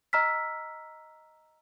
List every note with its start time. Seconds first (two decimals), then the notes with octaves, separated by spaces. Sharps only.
0.13 D#5 A#5 E6 F6 B6